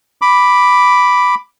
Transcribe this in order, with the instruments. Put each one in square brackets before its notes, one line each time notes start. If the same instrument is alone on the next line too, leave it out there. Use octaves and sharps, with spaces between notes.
[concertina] B5 D6